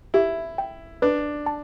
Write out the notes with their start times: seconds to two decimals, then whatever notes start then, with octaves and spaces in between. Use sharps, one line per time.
0.14 E4 G4
0.58 G5
1.02 D4 B4
1.46 A5